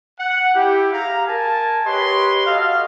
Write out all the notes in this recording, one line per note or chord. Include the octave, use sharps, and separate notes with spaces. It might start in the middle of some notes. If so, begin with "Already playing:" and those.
F#5
E4 G4
G#4 F5 A#5
A#4 G#5 A5
G4 B4 C#5 D#5 C6
F#4 A4 D#5 F5